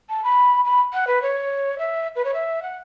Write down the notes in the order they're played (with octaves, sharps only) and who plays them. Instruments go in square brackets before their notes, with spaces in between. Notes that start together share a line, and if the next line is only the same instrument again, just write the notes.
[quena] A5
B5
B5
F#5
B4
C#5
E5
B4
C#5
E5
F#5